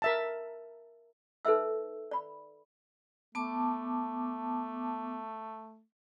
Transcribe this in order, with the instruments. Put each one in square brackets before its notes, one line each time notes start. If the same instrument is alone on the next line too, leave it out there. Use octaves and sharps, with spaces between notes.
[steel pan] A#4 E5 A5
[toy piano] D#4 A4 B4 C5 E5 E6
D5 B5
[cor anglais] A3 [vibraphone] B3 A5 D6